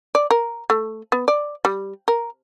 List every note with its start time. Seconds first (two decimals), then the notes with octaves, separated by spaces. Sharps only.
0.15 D5
0.31 A#4
0.70 A3
1.12 B3
1.28 D5
1.65 G3
2.08 A#4